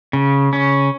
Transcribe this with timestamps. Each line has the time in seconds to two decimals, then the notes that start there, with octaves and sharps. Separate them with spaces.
0.13 C#3
0.53 C#4